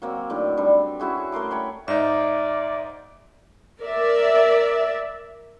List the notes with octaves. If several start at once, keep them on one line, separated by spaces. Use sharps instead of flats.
F#3 A#3 C4
A2 D3 D#3
G3 C4 D4
C#4 E4 F#4 G#4
A3 A#4 C6 D6
C#5 G5 A5 B5
G#2 D#4 D5 E5
A#4 D5 E5